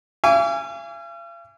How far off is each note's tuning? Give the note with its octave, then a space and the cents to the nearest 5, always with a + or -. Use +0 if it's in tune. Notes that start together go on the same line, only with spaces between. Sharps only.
F5 -45 G#5 -20 D6 -40